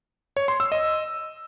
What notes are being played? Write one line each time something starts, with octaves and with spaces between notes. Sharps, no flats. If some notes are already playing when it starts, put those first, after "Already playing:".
C#5
C6
E6
D#5